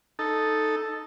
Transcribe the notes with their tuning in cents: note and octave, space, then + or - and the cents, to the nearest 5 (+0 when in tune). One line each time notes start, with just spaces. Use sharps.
D#4 +0 A4 +0